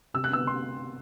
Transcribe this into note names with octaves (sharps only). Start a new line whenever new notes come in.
C3 E6
F#6
B3 E6
C6